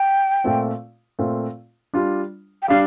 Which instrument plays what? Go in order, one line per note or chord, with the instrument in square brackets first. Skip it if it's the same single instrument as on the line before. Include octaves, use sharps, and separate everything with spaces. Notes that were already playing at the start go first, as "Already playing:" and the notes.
Already playing: [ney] G5
[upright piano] A#2 A3 C4 F4
A#2 A3 C4 F4
G3 D4 F4
[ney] G5
[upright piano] G3 D4 [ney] F5